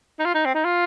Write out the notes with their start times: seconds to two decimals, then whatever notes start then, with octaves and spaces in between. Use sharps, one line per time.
0.19 D#4
0.25 F4
0.35 D#4
0.46 C4
0.55 D#4
0.65 F4